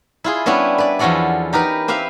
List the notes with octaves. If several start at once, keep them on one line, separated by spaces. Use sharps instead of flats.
E4 F4 G#4
G3 B3 C#4 D4 E4
B4 D5
E2 F3 C#4 F#4 A4 D5
D#4 G4 A#4 B4
C4 G4 B4 E5 F5